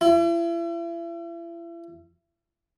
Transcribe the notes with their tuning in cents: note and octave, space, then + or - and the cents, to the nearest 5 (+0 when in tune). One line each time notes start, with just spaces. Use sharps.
E4 +40